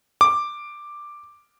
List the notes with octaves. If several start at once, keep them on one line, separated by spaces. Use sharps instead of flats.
D6